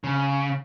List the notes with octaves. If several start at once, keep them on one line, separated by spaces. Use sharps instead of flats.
C#3